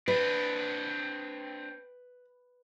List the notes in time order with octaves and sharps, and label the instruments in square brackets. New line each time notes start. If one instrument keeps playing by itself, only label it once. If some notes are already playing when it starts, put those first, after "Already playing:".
[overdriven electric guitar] C4 D4 [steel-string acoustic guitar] B4